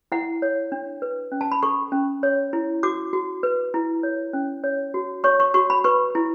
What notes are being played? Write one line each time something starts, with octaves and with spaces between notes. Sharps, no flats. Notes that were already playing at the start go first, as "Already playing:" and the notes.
E4 F#5
C#5
D4
B4
C#4
A5
B5
A4 C#6
C#4
C#5
E4
F#4 D6
F#4
B4
E4
C#5
C#4
C#5
F#4
C#5 C#6
C#6
F#4 C#6
B5
B4 C#6
E4